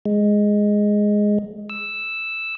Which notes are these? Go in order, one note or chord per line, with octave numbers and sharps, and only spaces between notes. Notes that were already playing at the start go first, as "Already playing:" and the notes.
G#3
E6